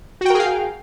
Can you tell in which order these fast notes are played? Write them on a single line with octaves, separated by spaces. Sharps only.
F#4 G5 A#4 G#4 F5